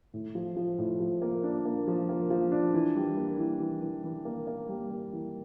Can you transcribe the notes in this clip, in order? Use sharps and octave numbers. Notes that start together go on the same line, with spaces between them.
A2
F3
F3
A2
F3
A#3
D4
A#3
F3
A#3
F3
D4
E3
G3
A#3
E3
E3
E3
E3
A#3
A#3
G3
A#3
E3